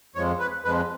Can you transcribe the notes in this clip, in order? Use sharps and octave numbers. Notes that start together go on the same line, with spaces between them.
F2 F3 G#3 C#5
B4
F2 F3 G#3 B4